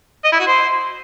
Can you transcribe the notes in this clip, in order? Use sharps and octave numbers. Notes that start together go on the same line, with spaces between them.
D#5
E4
F#4
C5